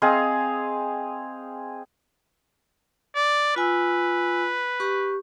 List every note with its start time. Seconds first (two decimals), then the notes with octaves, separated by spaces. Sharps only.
0.02 C4 G#4 D#5 F5
3.16 D5
3.56 F4 B4 G#5 E6
4.80 G4 C#6